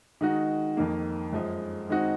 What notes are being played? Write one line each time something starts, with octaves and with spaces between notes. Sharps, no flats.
D#3 G#3 D#4 F#4
F2 D#3 A#3
F#2 F3 G#3
D#3 G#3 C4 D#4 F#4